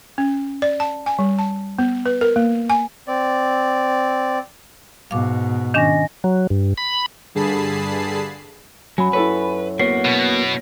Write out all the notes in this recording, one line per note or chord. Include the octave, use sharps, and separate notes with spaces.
C#4
D5
A5
G#5
G3
A5
B3
B4
A#4
A#3
G#5
C4 D5
G#2 B2 F5 D6
D#3 C#4 D4 D#5 G#5 A#6
F#3
G2
B5
G2 D3 G#4 A5 B5 C7
F#2 F#3 G#5 B5
E4 A4 B4 C#5
A#3 B3 F#4 C#5 C7
B2